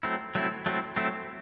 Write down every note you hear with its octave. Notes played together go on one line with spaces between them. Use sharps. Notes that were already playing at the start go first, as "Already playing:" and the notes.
F#3 A3 C4 E4
F#3 A3 C4 E4
F#3 A3 C4 E4
F#3 A3 C4 E4